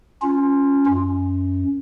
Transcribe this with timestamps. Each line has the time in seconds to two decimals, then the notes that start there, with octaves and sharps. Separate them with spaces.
0.22 C#4 F4
0.86 F#2